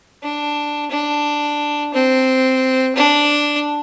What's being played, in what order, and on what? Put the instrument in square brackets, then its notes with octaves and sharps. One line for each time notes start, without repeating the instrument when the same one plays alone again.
[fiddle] D4
D4
C4
D4